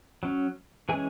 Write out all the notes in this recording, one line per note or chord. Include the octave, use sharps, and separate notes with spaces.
F#3 C#4
E3 G#3 C#4 G#4 G#5